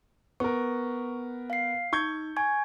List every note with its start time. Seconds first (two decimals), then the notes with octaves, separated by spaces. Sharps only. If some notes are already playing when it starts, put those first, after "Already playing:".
0.40 B3 A#4 C#6
1.50 F5 C7
1.93 D#4 C#6 G6 G#6
2.36 G#5 C#6 G#6